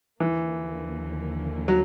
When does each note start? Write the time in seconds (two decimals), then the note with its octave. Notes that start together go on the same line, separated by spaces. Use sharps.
0.20 D#2 D3 E3 F3 A#3
1.68 F#3